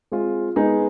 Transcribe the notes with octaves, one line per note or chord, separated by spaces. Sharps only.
G#3 C4 F4 G#4
G#3 B3 D#4 G#4